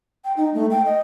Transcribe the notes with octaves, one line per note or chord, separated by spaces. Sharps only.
G5
D#4
A3
G5
D#5